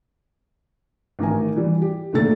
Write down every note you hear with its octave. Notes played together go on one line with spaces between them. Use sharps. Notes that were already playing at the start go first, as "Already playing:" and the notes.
A1 D#3 A#4 G#5
E3 G3
G4
D2 A#2 D#3 A3 A6